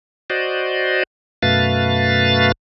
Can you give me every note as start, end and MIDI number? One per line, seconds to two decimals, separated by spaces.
0.30 1.03 66
0.30 1.03 72
0.30 1.03 74
0.30 1.03 75
1.42 2.52 42
1.42 2.52 47
1.42 2.52 57
1.42 2.52 71
1.42 2.52 77
1.42 2.52 93